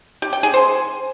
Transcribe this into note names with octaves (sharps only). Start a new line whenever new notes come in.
G4
G5
G#4
C5